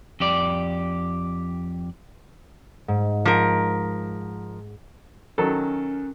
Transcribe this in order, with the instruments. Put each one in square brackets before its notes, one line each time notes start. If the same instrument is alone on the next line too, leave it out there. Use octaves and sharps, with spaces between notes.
[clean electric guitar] F2 G4 D5
[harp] G#2
[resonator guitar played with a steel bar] F3 A#4
[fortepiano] D#3 F#3 A4 [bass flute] C#4